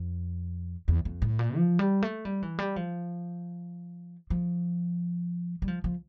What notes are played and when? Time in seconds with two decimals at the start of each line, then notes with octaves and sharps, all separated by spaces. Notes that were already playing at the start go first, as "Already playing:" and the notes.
Already playing: F2
0.88 E2
1.05 F2
1.22 A2
1.39 A#2
1.56 F3
1.79 G3
2.02 A3
2.25 G3
2.43 E3
2.59 G3
2.76 F3
4.30 F3
5.62 G3
5.68 F3
5.84 F3